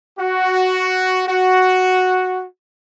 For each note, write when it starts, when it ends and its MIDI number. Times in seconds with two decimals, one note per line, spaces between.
0.19 1.27 66
1.27 2.46 66